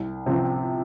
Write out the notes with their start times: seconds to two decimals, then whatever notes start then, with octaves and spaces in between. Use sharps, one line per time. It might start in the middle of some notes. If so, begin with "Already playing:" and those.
Already playing: C2
0.26 C3 F3 C4